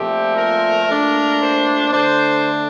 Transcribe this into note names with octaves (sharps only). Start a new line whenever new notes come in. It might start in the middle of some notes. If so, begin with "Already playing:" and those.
Already playing: A#2 F3 A3 C4 G4
A#4
A#2 A3 D4
C5
D3 A3 D4 C5